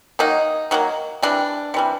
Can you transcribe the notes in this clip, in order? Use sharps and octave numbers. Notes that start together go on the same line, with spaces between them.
D#3 F#3 A#3 D#4
D#3 F#3 A#3
C3 E3 G3 D4
C3 E3 G3